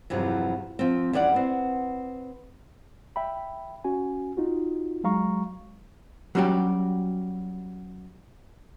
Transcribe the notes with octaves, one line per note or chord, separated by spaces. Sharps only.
E2 G2 C3 F3 F#3
F3 C4
E2 G3 C#4 D5 F5 F#5
B3 C4
E5 G5 B5
C#4 F#4 G#5
D#4 F4 F#4
F#3 G#3 F5 A#5 C#6
F#3 G3 C#4 F#4 G4